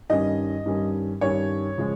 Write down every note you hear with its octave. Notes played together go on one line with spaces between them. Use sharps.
G2 D#3 G3 C#4 D#5
G2 D#3 G3 C#4
G2 D#3 G3 C#4 C#5
C#3 F3 G#3